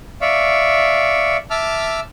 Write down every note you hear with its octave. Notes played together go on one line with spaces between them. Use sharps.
D5 E5 F5 C#6
E5 A5 D6 E6 F6